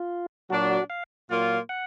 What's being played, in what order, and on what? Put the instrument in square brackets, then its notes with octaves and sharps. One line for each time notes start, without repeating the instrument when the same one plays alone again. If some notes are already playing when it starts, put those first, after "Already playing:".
Already playing: [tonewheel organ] F4
[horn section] A#2 F#3 D4 [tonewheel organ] F#4
[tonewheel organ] F#4
F5
[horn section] A#2 F#3 A#3 F4
[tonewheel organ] F#5